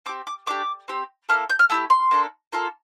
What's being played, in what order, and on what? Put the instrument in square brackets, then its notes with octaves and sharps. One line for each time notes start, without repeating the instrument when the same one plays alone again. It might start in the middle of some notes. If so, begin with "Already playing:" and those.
[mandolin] C4 D6
G4
D6
A3 D4 G4 D6
C4 G4
A#3 E4 A4 F6
G6
F6
A3 E4 G4 E6
C6
A#3 D4 A4
A#3 F4 A4